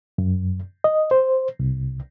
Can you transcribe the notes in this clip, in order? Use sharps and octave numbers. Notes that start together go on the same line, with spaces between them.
F#2
D#5
C5
C2